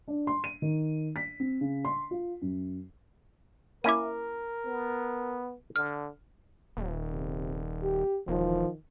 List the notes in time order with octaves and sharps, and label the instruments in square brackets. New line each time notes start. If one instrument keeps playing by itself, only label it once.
[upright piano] D4
C6
D#7
D#3
B6
C4
C#3
C6
F4
F#2
[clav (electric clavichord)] A#3 C#4 E4 [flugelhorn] A#4 [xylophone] D6 D#7
[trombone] B3
[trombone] D3 [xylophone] F6
[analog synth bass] D#1
[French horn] C3
G4
[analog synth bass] E1 [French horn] D#3 [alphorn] F3